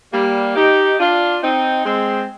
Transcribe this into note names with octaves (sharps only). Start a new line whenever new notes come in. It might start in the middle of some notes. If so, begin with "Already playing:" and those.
G3 A#3
D#4 G4
D4 F4
C4 D#4
G#3 C4